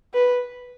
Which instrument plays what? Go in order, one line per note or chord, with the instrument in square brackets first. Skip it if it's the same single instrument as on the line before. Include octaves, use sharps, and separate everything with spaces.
[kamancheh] B4